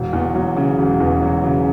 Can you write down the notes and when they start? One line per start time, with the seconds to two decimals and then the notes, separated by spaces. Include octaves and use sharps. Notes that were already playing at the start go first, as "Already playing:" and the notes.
Already playing: E1
0.13 E2
0.35 F#3
0.57 C#3
0.78 E1
1.00 E2
1.22 F#3
1.44 C#3